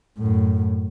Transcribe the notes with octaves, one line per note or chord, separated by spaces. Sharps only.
F#2 A2